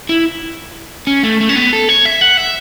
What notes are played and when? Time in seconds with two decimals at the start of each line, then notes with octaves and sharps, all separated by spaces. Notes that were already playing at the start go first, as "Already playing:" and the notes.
0.09 E4
1.07 C#4
1.23 A3
1.40 A3
1.49 C#4
1.56 B3
1.73 A4
1.89 C#5
2.05 E5
2.21 F#5
2.37 E5